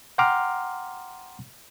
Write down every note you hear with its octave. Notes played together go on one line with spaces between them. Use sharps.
F#5 G5 A#5 C6 D6 F6